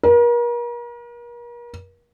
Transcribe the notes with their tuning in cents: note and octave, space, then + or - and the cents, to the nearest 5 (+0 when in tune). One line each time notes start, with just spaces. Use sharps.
A#4 +40